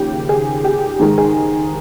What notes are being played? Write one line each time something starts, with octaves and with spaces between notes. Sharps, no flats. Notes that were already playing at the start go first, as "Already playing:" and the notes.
Already playing: D#2 C#3 F3 G4
G#4
G4
G#2 D#3 G#3
G#4